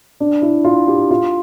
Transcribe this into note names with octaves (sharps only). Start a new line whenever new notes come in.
D4
E4
F4
G4
F4